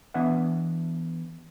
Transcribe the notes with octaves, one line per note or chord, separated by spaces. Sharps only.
E3 B3 D4 E5 F#5